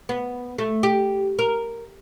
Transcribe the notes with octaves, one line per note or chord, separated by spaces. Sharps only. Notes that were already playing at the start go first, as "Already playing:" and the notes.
B3
A3
G4
A#4